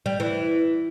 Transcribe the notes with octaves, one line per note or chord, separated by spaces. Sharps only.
G3
E3